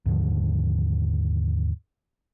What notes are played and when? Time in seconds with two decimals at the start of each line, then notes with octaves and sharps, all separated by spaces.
0.06 D#2 G#2 D3 F3